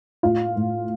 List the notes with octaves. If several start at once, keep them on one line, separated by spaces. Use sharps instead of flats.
A2 F4 F5
A2